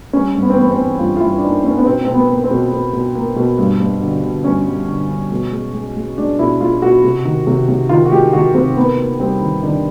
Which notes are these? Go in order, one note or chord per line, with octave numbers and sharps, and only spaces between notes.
G3 C#4
G2
B3
C4
E3 B3
C4
E3
G2 F4
F4
G2 E4
D4
A#3 D#4
A#3 C#4
B3
B2 C4
B2 C4
B3
A#3
C4
B2
B2
B2
A#3
B2
G2
G2
D3
D3
G2 C#4
G3
D3
D3
B2
G#3
G#3
G#3
G#3 D4
B2 E4
G#3 F4
B2 F#4
C3
D#3
C3
C3
D#3 F4
F#4
G#3 G4
D#3 F#4
C3 C4
A#3 B3
A#3
G3 C4
D#3
D#3 D4